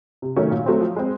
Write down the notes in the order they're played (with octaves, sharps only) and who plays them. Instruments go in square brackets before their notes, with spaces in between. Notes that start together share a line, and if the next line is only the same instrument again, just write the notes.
[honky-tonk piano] C3
D#3 F#3 A3 C#4
A#2
F#3 A3 C4
F3
G#3 C4